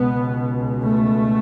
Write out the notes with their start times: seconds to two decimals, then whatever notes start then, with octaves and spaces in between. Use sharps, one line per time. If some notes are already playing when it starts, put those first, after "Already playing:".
Already playing: C#2 B2 B3
0.84 A3